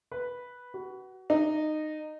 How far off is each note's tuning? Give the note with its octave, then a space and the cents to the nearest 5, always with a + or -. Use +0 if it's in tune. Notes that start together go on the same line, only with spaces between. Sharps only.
B4 -5
F#4 +25
D#4 -15